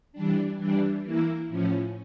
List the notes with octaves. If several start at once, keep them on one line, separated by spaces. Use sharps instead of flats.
E3 G3 D4
E3 G3 D4
E3 A#3 E4
A2 F3 C#4